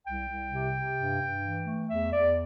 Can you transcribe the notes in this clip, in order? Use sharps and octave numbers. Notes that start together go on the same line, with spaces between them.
C2 G5
C2
C3
C3
G2
G2
E3
A3
E2 E5
E2 D5